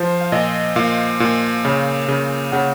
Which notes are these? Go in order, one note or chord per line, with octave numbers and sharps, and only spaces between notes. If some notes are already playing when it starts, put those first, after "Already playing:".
Already playing: F3 C5
F5
A#2 D#5
A#2 F5
A#2
C#3
C#3
C#3 F#5